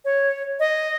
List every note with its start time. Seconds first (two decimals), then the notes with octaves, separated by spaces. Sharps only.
0.05 C#5
0.60 D#5